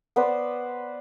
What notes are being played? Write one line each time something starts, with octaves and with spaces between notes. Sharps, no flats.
B3 B4 C5 D5